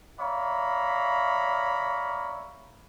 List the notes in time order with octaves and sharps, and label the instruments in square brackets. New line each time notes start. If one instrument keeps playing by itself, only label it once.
[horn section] C#5 D5 E5 F5 A#5 B5